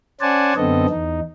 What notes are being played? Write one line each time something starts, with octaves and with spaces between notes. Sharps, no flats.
C#4 C5 D5 F#5 G#5 A5
F#2 D3 B3 C4 A4 D#5
E2 D#4